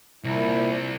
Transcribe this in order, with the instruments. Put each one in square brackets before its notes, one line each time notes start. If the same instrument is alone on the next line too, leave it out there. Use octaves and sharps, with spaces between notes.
[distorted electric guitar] C2 [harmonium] A#2 E4